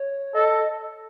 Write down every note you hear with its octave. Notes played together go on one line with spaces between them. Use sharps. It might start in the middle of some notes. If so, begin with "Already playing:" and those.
Already playing: C#5
A4 D#5